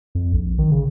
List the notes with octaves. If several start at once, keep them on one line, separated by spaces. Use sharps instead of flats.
F2
A#1
D#3
C#3